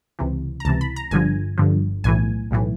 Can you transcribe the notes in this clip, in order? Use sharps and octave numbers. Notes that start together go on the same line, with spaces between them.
C#2 C3 E3
A#5
C#2 C3 E3 A5
B5
A#5
G1 G2 D3 F3 G#5
G1 G2 D3 F3
B1 A2 E3 G#5
B1 A2 E3